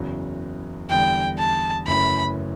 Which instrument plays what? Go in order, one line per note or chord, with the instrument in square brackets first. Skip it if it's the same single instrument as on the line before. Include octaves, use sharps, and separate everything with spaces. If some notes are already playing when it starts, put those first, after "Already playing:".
Already playing: [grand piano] F#1 E2 C#3 F#3
[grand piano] E2 D3 G3 [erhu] G5
[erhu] A5
[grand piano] F#1 F#2 E3 A3 C#4 [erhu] B5